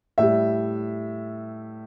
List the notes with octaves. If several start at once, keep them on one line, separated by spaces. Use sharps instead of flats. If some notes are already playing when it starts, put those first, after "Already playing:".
A2 G3 E5